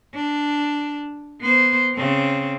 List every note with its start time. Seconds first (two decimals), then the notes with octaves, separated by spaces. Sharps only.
0.14 D4
1.41 B3 C5
1.96 C#3 C4